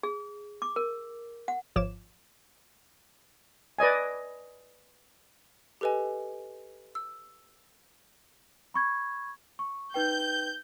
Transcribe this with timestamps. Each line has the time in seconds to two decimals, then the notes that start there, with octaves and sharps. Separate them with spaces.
0.03 G#4
0.62 D6
0.76 A#4
1.48 F#5
1.76 G#1 F3 C#5 D6 E7
3.79 B4 D5 D#5 G#5
5.81 G4 A4 B4 D#5 G#5
6.95 E6
8.74 B5 C#6 G#6
9.59 C#6
9.94 D#4 B4 G5 G6